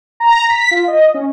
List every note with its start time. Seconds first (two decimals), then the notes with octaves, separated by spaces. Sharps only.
0.20 A#5
0.49 B6
0.71 F4
0.88 D#5
1.14 C#4